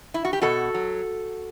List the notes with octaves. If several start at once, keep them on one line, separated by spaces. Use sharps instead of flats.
E4
F#4
G4
B2 F#4 A4
F#3